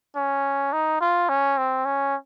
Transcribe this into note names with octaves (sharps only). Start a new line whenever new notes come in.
C#4
D#4
F4
C#4
C4
C#4